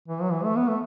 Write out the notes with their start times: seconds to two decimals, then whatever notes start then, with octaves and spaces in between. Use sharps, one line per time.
0.08 E3
0.22 F#3
0.32 E3
0.44 A3
0.56 B3
0.68 A3